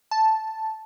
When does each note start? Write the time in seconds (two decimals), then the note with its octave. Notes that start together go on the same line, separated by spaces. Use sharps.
0.11 A5